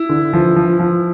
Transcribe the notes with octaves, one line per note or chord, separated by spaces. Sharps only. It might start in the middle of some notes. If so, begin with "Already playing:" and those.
Already playing: E4
D3
F3
F3
F3